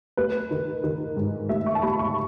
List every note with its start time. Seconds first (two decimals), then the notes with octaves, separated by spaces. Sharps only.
0.17 A3 B4
0.51 D#3
0.84 D#3
1.17 G#2
1.49 A3 E5
1.66 C#6
1.75 A5
1.83 A3 B5
1.99 C#6